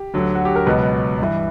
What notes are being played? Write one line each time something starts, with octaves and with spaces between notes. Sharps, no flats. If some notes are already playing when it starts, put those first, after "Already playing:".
Already playing: G4
D2 D3 F#3
F#4
G4
A#4
C#2 B2 F#3 B4
G2 E3